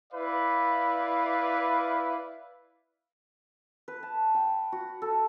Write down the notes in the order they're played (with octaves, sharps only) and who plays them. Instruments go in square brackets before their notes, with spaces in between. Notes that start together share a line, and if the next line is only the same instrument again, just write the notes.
[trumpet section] E4 B4 D5 F5
[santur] B4
A5
G5
F#4
A4